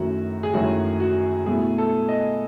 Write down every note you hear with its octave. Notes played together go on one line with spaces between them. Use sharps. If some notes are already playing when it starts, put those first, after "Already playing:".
Already playing: F#2 D#3 A3 C#4 E4 F#4
G#4
F#2 D#3 A3 C#4 E4 F#4
F#4
B2 A3 E4 G#4
A4
D#5